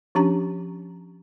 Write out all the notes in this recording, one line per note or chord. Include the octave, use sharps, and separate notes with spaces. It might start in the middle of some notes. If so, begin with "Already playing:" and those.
F3 C#4 D4 G4 A#5